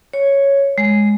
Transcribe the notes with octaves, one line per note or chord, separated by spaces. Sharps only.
C#5
G#3